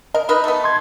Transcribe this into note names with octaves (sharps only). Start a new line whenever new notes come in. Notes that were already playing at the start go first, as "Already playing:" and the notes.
A#4 D#5
D#4 A#4 B4
A3 B3
C6 G#6